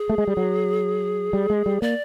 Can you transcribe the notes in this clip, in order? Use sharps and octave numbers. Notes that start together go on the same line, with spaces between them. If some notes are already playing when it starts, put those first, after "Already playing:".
Already playing: G#4
A3
G#3
G3
F#3
G3
G#3
G3
A#3 D5